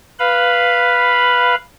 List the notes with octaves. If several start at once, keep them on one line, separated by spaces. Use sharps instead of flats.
B4 F5 B5